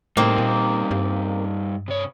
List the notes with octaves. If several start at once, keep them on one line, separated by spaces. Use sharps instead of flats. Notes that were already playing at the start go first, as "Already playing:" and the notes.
A2 G3 A#3 C4 D#4 G4
A#2
G2
C3 C#5